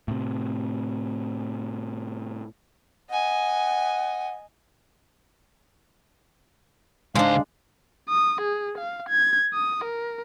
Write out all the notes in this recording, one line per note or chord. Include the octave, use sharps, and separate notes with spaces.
A2 C3
D#5 F#5 G#5
C#2 G#2 G#3 D4 C5 F5
D#6
G#4
F5
G#6
D#6
A#4